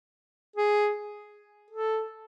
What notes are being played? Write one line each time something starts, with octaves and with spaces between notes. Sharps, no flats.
G#4
A4